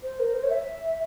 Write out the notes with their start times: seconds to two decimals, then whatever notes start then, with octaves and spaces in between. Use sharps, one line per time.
0.03 C5
0.20 A#4
0.34 C5
0.43 C#5
0.50 E5